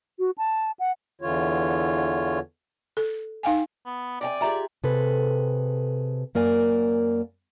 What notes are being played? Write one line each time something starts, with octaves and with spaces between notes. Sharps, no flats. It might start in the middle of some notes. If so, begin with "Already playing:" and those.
F#4
A5
F#5
E2 D3 E3 F4 C#5
A4
D#4 F5 G5 G#5
B3
C3 D5 G5 G#5
F4 G4 G#4 E5 A#5
C3 G#4 A4 B4
F#2 A#3 A#4 D5 G#5